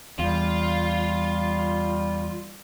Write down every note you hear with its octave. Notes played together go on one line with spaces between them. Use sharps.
E2 G3 F4